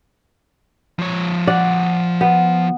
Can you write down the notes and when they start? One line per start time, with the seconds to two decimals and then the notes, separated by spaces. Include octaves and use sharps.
0.99 F3 C#5
1.47 D5 F#5
2.21 B3